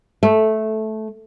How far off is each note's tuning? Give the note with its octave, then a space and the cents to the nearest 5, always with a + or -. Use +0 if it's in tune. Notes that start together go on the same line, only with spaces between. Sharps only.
A3 -10